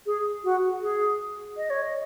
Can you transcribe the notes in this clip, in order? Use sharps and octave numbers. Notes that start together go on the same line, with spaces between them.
G#4
F#4
G#4
D#5
C#5
D#5